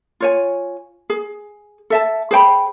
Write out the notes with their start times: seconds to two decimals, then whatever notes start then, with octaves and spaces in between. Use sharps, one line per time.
0.20 F4 C#5 G#5
1.10 G#4
1.90 A4 E5 A5
2.31 G#4 C5 G5 B5